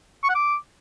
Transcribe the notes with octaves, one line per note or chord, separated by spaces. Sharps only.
C#6
F#5
D6